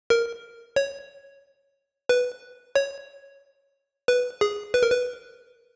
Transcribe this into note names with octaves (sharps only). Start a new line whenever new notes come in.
A#4
C#5
B4
C#5
B4
G#4
B4
A#4
B4